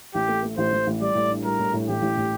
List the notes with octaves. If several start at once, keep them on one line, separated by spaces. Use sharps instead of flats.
A1 G4
A3
A3
A1 C5
A1
A1
G3 D5
A2
D4
G3 A#4
A2
A2
A1 G4
A1
A2